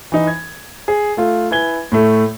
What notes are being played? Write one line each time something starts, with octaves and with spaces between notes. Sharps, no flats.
E3 D#4
G#6
G#4
A3 F4
E4 B4 G#5 G#6 G7
A2 A3